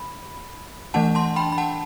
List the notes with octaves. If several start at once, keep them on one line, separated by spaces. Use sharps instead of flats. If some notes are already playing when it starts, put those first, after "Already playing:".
Already playing: B5
E3 A3 D4 F#5 A5
A5 C6
G5 B5
B5
F#5 A5